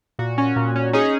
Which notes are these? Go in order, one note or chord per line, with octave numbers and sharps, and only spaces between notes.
A#2 F#4
C#4
A#2
C#4
C#4 D#4 G#4